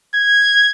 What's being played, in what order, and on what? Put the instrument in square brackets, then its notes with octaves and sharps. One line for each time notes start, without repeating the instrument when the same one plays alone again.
[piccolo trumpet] G#6